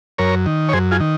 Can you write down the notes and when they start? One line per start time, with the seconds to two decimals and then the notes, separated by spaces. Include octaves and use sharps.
0.18 F#2 A#4 C#5
0.46 D#3
0.69 C#5
0.73 F#2 G#4 C5
0.91 F4 G#4
1.00 D#3